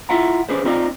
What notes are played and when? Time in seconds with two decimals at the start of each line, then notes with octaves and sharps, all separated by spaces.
0.09 E4 F4 E5 F#5 G5 A#5
0.49 C#4 G4 G#4 B4 C5
0.65 C4 D#4 F4 D5 D#5